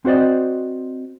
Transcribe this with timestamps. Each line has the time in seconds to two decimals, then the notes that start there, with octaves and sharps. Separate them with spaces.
0.05 C4 F#4 C5 D5 D#5